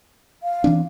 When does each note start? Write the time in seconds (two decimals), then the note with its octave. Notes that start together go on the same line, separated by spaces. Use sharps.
0.43 F5
0.64 E3 C4 D4